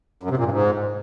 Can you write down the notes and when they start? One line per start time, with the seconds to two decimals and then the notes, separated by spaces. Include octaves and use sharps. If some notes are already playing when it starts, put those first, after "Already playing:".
0.23 F#2
0.30 C3
0.37 A#2
0.44 G2
0.51 G#2